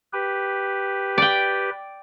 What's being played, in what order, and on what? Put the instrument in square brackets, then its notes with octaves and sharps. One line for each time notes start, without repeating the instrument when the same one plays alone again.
[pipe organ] G4 B4
[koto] D5 G5